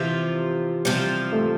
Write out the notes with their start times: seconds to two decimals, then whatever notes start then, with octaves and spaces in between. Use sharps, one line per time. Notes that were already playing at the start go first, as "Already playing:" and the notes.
Already playing: C3 E3 F3 C4 F4
0.85 C3 F3 G3 C4 F4
1.32 A3